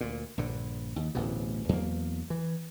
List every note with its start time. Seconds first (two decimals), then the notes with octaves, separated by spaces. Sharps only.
0.01 D2 A#2
0.37 A#1 G2 D3
0.96 D#2
1.15 D1 A1 B2
1.69 E2 F#3 A#3
2.30 E3